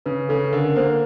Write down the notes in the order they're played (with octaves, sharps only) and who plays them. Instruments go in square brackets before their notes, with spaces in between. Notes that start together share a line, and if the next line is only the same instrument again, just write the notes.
[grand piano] C#3 [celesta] B4
[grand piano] C#3 [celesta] A4
[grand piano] D3 [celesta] A#4
[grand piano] A#3 [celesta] C5